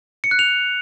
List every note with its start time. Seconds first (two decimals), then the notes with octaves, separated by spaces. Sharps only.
0.24 C#7
0.31 F#6
0.39 F7